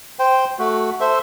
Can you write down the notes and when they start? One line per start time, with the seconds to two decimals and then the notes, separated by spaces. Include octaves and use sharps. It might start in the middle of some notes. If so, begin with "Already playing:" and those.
0.19 C5 G5
0.59 A3 F#4
1.00 A4 C5 E5